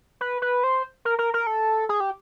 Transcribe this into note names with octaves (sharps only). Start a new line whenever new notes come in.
B4
B4
C5
A#4
A#4
A#4
A4
G#4
G4